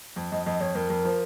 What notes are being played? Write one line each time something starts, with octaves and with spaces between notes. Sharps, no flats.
F2
F2 D#5
F2 D#5
F2 C#5
F2 A#4
F2
F3